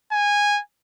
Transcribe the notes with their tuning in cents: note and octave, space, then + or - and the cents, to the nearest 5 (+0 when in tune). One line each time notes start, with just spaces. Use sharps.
G#5 -15